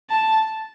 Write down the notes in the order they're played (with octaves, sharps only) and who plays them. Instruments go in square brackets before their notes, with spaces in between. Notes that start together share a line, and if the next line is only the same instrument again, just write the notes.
[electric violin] A5